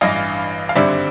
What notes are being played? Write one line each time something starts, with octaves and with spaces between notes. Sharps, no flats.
A1 G2 E3 D#5 F5
F5
G#1 G2 D3 G3 C4 D5 E5